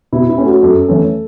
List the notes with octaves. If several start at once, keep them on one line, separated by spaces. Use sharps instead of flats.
B2 E4
E4
A3 C#4
F#4
F#2 A4
E3 A3 C#4